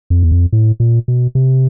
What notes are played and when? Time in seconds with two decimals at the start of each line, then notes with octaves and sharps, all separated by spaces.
0.10 F2
0.23 E2
0.32 F2
0.53 A2
0.80 A#2
1.08 B2
1.35 C3